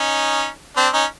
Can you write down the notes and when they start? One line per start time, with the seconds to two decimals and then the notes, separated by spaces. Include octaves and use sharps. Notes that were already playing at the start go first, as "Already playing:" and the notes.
Already playing: C#4 D#4
0.77 C4 D4
0.93 C#4 D#4